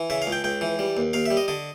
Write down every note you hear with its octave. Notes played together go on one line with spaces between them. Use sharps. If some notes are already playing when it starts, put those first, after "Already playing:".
Already playing: E3
C#3 E5
F5
C#2
G5
C#2 G5
E3
G3
D#2
D#2 F5
G3 E5
D#5
D3 D#5